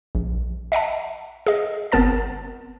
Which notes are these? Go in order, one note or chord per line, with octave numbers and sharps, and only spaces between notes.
A#1
D#5 E5 F#5 A5
G#4 D#5
G1 B3 C4 A#4 A5 A6